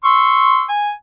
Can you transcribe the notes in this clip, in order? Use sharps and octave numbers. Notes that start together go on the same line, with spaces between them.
C6 C#6 E6
G#5